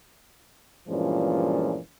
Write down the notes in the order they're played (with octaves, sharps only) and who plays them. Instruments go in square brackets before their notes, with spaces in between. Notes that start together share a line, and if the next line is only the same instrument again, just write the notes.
[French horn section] G2 A#2 E3 F3 G#3 C#4